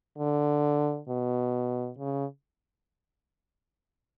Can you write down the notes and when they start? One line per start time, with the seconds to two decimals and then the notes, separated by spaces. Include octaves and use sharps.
0.18 D3
1.09 B2
1.99 C#3